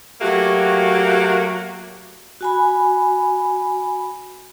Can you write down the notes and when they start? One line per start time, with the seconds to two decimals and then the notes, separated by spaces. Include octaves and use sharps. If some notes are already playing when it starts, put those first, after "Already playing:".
0.21 F#3 A3 A#3 F#4 G4
2.41 F#4 G#5 B5